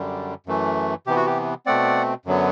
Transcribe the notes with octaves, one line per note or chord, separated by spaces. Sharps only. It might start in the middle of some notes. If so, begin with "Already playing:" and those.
Already playing: F#2 D3 G3
F#2 E3 A3
C3 E3 B3 G4
F#4
G4
B2 A3 C4 D5 F#5
F#2 D3 F#3 B3